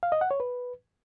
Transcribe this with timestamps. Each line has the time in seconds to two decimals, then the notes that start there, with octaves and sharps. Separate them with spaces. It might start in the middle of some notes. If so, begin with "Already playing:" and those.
0.03 F5
0.12 D#5
0.21 F#5
0.31 C#5
0.40 B4